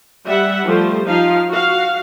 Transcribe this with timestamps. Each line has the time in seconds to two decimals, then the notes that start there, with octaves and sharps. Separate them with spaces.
0.25 G3 E5 F#5
0.64 F3 G3 A3 C5
1.06 F3 D#4 F5
1.49 F#4 F5